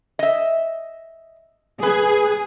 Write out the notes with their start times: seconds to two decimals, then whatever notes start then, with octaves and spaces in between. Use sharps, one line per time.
0.19 D#5 E5
1.83 G#4 B4